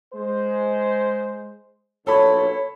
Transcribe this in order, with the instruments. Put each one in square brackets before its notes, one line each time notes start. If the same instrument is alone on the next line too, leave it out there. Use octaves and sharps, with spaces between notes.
[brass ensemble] G#3 C5
[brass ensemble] B1 G2 A#2 [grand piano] A4 B5 [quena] C#5